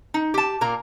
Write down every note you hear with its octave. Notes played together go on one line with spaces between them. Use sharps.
D#4
G4 A5
A#2 A#3 A#5